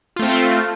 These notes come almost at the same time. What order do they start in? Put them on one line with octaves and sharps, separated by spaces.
F4 A3 C4